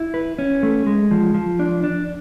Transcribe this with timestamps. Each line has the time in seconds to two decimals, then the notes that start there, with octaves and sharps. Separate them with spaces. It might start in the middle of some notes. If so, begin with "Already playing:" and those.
Already playing: E4
0.14 B4
0.39 C#4
0.63 A3
0.86 G#3
1.11 F3
1.34 F3
1.59 D4
1.83 D4